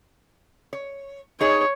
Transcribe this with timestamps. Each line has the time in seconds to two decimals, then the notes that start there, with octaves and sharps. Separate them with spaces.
0.73 C#5
1.40 D#4 G#4 C#5